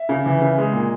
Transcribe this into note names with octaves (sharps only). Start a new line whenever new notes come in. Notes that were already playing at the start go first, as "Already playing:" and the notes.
Already playing: E5
C#3
E3
C#3
G#3
A#2